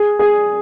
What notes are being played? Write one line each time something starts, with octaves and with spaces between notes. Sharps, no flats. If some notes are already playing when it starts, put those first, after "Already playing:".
Already playing: G#4
G#4